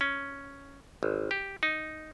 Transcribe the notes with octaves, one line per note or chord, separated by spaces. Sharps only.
C#4
G#1
G4
D#4